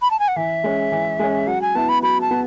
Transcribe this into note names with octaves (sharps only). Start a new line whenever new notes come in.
B5
A5
G#5
F#5
E3 E5
G#3 C#4
E3
G#3 C#4
F#3 F#5
G#5
B3 E4 A5
B5
F#3 B5
A5
B3